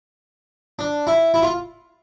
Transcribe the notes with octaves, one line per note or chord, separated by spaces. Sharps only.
D4
E4
E4
F4